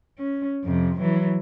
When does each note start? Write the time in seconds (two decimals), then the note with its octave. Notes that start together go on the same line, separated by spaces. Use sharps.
0.19 C#4
0.64 F2 C3
1.00 E3 F#3